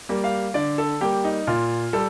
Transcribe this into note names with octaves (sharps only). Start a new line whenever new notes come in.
G3 A#3
F5
D3 D5
A4
G3 A#3 G4
D#4
A#2 F4
G3 A4